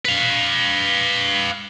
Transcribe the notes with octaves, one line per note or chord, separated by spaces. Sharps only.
B4 F5